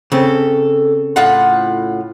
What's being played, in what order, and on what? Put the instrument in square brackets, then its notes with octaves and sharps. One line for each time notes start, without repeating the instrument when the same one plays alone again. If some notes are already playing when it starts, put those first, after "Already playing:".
[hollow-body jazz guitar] C#3 C4 [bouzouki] A4
[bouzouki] A2 F4 F#5